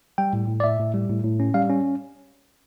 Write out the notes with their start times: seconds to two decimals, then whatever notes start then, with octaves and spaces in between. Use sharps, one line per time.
0.18 G3 G5
0.33 A2
0.48 A2
0.60 D5
0.64 A2 E5
0.79 A2
0.94 G3
1.09 A2
1.24 A2
1.40 C#4
1.54 G3 F5
1.70 C#4